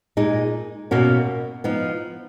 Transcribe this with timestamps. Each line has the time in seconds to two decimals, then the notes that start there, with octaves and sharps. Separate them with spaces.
0.17 A#2 G#3 D#4 G#4
0.91 B2 A#3 C#4 F#4 A#4
1.64 F3 B3 D#4